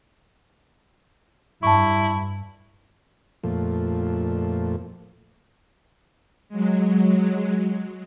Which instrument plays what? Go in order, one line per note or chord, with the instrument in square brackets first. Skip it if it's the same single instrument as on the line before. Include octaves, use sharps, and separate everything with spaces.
[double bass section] G2 [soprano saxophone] E4 [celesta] A5 C#6
[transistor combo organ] F2 A#2 F3 A3
[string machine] F#3 G#3